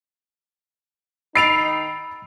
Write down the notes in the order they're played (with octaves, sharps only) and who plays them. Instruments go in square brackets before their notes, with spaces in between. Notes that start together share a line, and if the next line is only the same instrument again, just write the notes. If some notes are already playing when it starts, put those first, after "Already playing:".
[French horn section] D#3 D#4 [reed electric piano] B5 E6 A6 [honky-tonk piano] C7 D7 F7